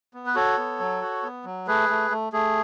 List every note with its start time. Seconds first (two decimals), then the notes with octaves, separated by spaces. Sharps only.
0.14 B3
0.26 B4
0.35 F#4 A4 C#5
0.58 B3
0.80 F#3
1.02 F#4
1.23 B3
1.45 F#3
1.67 A3 G#4 B4
1.89 A3
2.11 A3
2.33 A3 G#4